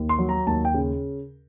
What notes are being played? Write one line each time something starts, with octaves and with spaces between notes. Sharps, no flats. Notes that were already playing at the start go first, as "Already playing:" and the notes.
Already playing: D#2
C6
F#3
A#5
D#2 A5
G5
C#3